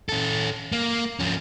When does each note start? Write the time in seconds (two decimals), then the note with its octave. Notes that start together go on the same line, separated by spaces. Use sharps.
0.09 C#4 A4
0.72 A#3
1.20 F3 C#4